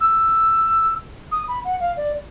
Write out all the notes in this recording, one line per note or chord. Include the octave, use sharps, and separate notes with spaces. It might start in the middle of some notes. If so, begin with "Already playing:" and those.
E6
D#6
B5
F#5
F5
D5